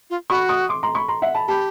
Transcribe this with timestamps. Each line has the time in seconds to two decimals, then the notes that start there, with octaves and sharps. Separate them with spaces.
0.10 F4
0.30 F#4 B5 C#6
0.49 C#6 D#6
0.69 C6 D6
0.83 A#5 C6
0.95 B5 C#6
1.08 A#5 C6
1.22 E5 F#5
1.35 A5 B5
1.48 G4 A5 B5